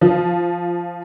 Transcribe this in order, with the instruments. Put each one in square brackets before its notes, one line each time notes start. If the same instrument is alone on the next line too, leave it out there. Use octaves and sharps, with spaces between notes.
[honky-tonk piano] F3